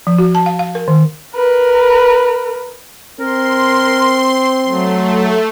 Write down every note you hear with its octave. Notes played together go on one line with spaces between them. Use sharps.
F3
F#4
A5
F5
F5
A#4
D#3
A#4 B4
C4 A#4 C6
F#3 A3